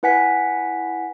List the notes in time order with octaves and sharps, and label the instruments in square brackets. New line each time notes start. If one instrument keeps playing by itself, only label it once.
[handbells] E4 B4 F#5 G#5 B6